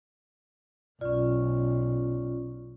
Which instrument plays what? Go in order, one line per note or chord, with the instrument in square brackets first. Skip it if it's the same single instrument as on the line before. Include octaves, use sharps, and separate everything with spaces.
[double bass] B1 [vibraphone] C#4 F4 [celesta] D5